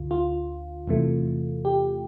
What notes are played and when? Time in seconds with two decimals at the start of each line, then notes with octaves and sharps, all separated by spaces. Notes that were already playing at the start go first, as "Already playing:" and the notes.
Already playing: D2 D3 F4
0.11 F4
0.88 E2 C3 E3 A3
1.65 G4